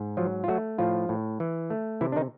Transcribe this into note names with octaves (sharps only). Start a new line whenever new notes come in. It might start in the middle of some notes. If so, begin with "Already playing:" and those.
Already playing: G#2
F3 F#3 F4
F4
F#3 A3 F#4
A2 F3 F4
A2
E3
A3
C3 E3 E4
D4
D#3 D#4